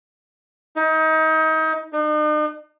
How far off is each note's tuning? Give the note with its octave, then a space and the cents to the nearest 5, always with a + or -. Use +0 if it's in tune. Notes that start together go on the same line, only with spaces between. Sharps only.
D#4 +30
D#4 -45